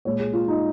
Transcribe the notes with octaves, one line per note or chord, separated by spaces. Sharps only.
A#2 G#3 C#5
G#4
F4
D#4